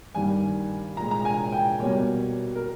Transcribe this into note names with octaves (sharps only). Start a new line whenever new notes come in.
G2 D#3 G3 A#3 G#5
A#2 G#3 A#5
A#5
G#5
G5
B2 G3 A#3 C#5
A#4